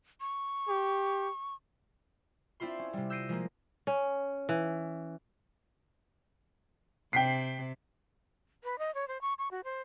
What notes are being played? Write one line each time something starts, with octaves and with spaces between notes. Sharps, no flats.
C#6
G4
C4 D4 E4 F4 C6
C#4
C3 G3
E6 G6 A#6 C7 D7 D#7
F3 G#3 A#3
C#4
E3
C3 G5 B6 C7
B4
D#5
C#5
C5
C#6
C#6
F#4
C5